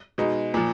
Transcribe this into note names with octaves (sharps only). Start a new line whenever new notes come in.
B2 G#3 D#4
A#2 F3